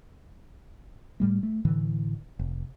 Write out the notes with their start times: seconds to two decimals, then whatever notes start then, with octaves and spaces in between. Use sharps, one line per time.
1.20 A2 G3 A3
1.43 A3
1.65 A2 D3 E3
2.39 F1